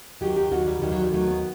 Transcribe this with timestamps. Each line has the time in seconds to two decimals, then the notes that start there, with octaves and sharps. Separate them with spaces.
0.21 D#2 D#3 F#3 G4
0.37 G4
0.52 D#2 D#3 F#3 F#4
0.67 G3
0.81 D#2 D#3 F#3 G3
0.92 F#3
1.02 G3
1.12 D#2 D#3 F#3 A3
1.27 B3